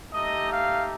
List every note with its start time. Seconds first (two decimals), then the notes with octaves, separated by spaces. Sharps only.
0.12 A3 D#4 G4 D#5
0.51 F5